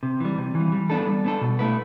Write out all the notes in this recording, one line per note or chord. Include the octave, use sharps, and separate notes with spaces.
C3
E3 G3
C3
E3 G3
G3
B3 D4 A4
G3
B3 D4 A4
B2
A3 E4 B4